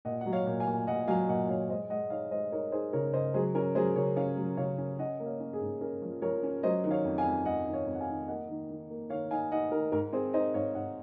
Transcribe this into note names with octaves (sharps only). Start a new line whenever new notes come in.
A#2 D#5 F#5
F#3 F#5
C#5 F5
A#2
F5 G#5
A#2
A#2 D#5 F#5
F#3 F5 G#5
A#2 D#5 F#5
F#3 C#5 F5
G#3 C5 D#5
G#3 D#5 F#5
D#4 C#5 F5
G#3 C5 D#5
D#4 A#4 C#5
D#4 G#4 C5
C#3 A#4 C#5
C#3 C5 D#5
F#3 G#4 C5
C#4 A#4
F#3 G#4 C5
C#3 A#4 C#5
C#4 C#5 F5
F#3
C#3 C#5 F5
C#4
C#4 D#5 F#5
A#3
C#5 F5
C#4
G#4
G#2
C#4 A#4
F3
F3 A#4 C#5
C#4
F#3 C5 D#5
D#3
C#5 F5
F2
F5 G#5
F2
F2 D#5 F#5
D#3
C#5 F5
F2
F#5
F5 G#5
D#3
A#3 D#5 F#5
D#3
D#3
A#3
D#3 C#5 F5
D#4 F5 G#5
D#4 D#5 F#5
D#3 A#4
G#2 A#4
C4 G#4 C5
D#4 C5 D#5
G#2 C#5 F5
G#2 D#5 F#5